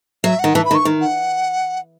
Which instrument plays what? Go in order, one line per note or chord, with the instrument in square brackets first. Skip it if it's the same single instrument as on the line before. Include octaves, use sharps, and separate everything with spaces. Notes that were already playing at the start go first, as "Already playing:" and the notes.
[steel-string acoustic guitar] F#3 [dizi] E5
[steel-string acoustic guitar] D#3 [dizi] F#5
[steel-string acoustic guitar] E3 [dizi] A5
[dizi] B5
[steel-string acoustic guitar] D#3
[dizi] C#6
[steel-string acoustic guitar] D#3
[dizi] F#5